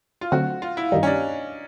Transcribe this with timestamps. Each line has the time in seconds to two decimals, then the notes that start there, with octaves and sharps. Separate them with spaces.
0.21 F4
0.32 D3 F#3 A3 C4 F#4
0.62 F4
0.77 E4
0.92 G2 D#3 G3 D#4
1.03 C#4
1.07 D4